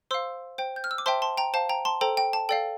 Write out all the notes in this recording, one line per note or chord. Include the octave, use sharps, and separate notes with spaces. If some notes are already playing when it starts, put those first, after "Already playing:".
C5 F5 C6 E6
C5 G5
G6
F6
E6
D6
C5 E5 G5 A5 C6
A5 C6
G5 A#5
C5 F5 A5
G5 A#5
A5 C6
A4 C5 G5 A#5
G5
A5
A4 D5 F5 G5